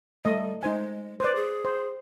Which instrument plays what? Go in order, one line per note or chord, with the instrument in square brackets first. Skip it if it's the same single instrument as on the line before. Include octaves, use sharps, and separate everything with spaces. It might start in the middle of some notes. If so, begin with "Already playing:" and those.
[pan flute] G3 [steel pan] A3 D#5
[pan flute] G#3 [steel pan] D#4 C5 G#5
[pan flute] B4 [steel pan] C5 D5
[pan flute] G#4
[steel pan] C5